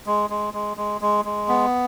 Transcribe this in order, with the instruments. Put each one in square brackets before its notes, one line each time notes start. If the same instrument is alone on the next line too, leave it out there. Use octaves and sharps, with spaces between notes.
[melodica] G#3
G#3
G#3
G#3
G#3
G#3
B3